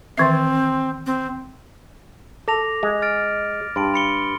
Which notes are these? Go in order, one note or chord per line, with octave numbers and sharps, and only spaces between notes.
D#3 E3 C4 E5
C4
A4 D6 A#6 F7
G#3
F6 A6 D7
G2 B5 C6 D7
B5 C#7 G7